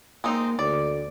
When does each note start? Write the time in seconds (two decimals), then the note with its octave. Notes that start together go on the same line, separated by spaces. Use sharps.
0.24 G#3 A#3 C4 D#4
0.59 D2 D5